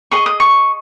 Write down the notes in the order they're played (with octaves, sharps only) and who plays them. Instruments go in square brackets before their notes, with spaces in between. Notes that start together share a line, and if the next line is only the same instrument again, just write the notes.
[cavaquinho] G#4 D#5 C#6
D#6
C#6